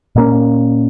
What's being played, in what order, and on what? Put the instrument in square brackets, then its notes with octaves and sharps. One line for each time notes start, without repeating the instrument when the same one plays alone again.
[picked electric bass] A#2 A#3 C#4